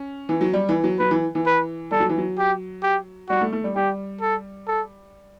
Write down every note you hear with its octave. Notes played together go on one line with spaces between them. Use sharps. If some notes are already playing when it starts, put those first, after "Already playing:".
Already playing: C#4
E3
F#3
G3
E3
F#3
F#3 B4
E3
E3
B4
G3 A4
F#3
E3
F#3
G4
G4
G3 F#4
A3
A3
G3
G3 G4
A4
A4